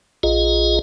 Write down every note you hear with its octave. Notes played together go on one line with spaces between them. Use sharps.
A#1 F4 G#4 D#5